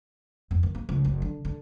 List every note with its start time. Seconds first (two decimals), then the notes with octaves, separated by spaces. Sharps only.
0.51 F2
0.63 D#3
0.75 A#3
0.89 C#2
1.05 F#1
1.22 D3
1.45 D3